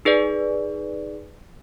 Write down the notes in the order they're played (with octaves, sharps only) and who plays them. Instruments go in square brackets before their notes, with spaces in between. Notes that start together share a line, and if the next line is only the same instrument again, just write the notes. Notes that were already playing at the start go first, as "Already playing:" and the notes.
[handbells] D#4 G#4 B4 D5